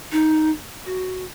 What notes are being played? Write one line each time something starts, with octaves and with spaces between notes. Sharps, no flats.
D#4
F#4